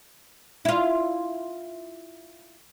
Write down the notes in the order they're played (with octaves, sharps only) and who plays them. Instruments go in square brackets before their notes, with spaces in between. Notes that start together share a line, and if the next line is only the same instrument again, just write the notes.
[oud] E4 F4